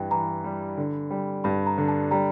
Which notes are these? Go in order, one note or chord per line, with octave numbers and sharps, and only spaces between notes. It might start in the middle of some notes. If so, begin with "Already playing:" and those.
Already playing: G2 E3 G5
E3 A#5
G3
D3
G3
G2 B5
A#5
D3
A5
G3 A#5